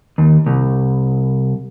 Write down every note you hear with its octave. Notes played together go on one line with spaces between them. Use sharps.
D#2
C2